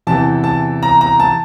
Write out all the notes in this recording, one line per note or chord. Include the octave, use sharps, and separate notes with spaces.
E2 C3 E3 A5
A5
A#5
A#5
A5